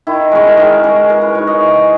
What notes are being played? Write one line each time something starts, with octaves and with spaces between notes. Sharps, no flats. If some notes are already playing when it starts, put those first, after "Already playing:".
D#3 E4
G#3 C#4
A#4
D#3 G#4
G#3 C#4 A#4
E3 A#4
B4
G#3 D#4 C#5
D#5
E3